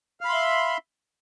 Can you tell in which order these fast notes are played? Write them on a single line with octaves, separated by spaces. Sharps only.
F5 B5 C6 E5